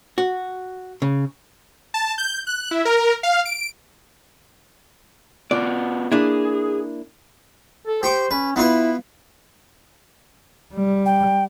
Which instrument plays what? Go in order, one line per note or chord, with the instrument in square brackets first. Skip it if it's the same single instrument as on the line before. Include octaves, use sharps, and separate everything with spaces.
[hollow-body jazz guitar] F#4
C#3
[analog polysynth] A5
G6
F#6
E4
A#4
F5
D7
[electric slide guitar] B3 F4 F#4 [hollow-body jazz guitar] D5
[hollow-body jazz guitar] A#3 D4 E4 [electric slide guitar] G#4
[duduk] A4
[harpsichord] G4 C#6 D6 [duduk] C5
[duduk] C#4 [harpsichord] B4
[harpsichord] B3 F4 B4 [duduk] E4
[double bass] G3
[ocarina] G5